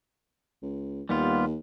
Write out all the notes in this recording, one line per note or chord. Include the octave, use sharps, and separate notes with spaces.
C#2
D#2 G3 B3 F4